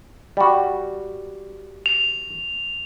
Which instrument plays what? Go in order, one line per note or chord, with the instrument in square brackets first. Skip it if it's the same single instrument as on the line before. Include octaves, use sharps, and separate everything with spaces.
[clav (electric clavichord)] G3 F#4
[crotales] F7